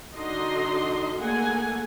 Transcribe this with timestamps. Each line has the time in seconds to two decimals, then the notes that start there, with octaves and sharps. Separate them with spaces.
0.15 D3 D4 D#4 F#4 D#5 C6
1.18 A3 A#3 G#4 F#5 G#5